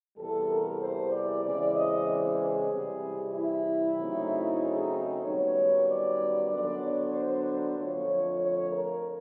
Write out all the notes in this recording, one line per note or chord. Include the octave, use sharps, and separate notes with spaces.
E2 C3 E3 G3 A4
A#4
C5
D5
E2 C#3 E3 G#3 C4 D5
D#5
D5
G#4
C3 E3 G3
E4
C#3 F#3 A3 C4 D#4
G#4
C5
F#2 D#3 G3 B3 C#5
D5
D3 F#3 B3 D4 D5
C#5
C5
C5
F2 D3 F3 A3 C#5
C#5
A#4